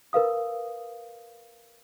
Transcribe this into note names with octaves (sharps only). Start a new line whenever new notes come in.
A#4 B4 F5 D#6